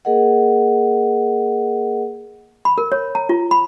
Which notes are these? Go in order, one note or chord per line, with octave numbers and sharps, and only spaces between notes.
A#3 G#4 A#4 D#5 F#5
B5
A#4
C#5
A#5
F4
B5